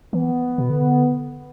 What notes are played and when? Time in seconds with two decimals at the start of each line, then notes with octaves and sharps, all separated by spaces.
0.13 E3 B3
0.58 B2
0.70 D3